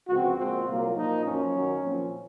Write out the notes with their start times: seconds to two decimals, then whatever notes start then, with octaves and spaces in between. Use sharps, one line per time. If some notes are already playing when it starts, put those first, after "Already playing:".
0.08 C#2 C3 F3 C4 F#4
0.37 A#2 F3 G#3 C4 F#4
0.67 C2 A#2 F#3 A#3 F4
0.96 A#2 F3 A#3 D#4
1.25 F#2 F3 A#3 C#4
1.54 F#2 D#3 F#3
1.83 A#2 F3 C4